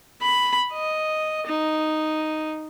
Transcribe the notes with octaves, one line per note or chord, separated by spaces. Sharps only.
B5
D#5
D#4